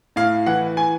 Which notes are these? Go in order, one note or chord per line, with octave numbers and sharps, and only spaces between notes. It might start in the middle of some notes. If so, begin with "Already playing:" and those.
A2 F5
E3 F#5
G#5